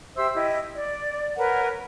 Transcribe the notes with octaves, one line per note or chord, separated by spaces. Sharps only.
G4 C5 E5 E6
E4 G4 D#5
D5
A#4 B4 C#5 F#5